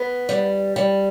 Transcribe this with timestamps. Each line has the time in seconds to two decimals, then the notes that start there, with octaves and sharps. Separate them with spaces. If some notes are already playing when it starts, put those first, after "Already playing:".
Already playing: B3
0.29 G3
0.76 G3